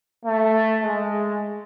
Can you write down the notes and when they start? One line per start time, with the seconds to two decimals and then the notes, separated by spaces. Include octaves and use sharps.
0.25 A3
0.82 G#3